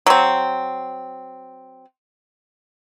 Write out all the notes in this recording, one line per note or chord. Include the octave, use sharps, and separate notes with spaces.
F#3 C4